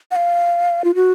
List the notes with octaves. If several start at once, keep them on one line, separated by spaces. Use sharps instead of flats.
F#5
F5
F4
F#4